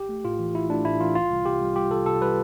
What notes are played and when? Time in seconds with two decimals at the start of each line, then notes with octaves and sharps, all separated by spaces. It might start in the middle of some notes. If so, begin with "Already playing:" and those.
Already playing: A1 G4
0.09 A3
0.24 A2 F4
0.39 E3
0.55 A1 E4
0.70 A3 D4
0.85 A2 E4
1.00 E3 F4
1.15 C2 F4
1.30 C2
1.45 C3 G4
1.61 G3
1.76 C2 G4
1.91 C2 A4
2.06 C3 A4
2.21 G3 B4